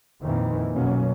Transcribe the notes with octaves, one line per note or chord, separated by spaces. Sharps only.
F2 A#2 D#3 E3
F#2 B2 F#3 A#3 C#4